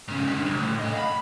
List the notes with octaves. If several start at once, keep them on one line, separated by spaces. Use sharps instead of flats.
G#2 C#3
G2 D3
C2
A2
A4 D#5
F5 B5